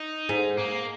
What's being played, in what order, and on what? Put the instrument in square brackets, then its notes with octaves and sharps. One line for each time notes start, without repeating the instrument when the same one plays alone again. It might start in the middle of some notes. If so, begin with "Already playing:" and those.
Already playing: [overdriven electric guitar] D#4
[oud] G#2
[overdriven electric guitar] A#3